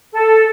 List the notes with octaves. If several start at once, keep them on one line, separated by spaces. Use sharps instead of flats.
A4